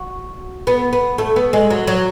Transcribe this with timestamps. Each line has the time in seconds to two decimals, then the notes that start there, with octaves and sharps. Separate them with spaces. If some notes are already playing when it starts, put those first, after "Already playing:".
Already playing: F#4
0.67 B3
0.93 B3
1.18 A3
1.36 B3
1.53 G#3
1.70 F#3
1.87 F#3